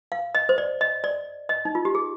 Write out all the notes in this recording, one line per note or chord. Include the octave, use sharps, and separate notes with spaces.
F5
D#5
C5
D5
D#5
D5
D#5
D#4
F4
G4
G#4